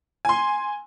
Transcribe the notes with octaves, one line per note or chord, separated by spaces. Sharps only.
G#5 C6